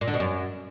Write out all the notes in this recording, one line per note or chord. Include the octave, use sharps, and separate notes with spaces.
A#2
D3
B2
F#2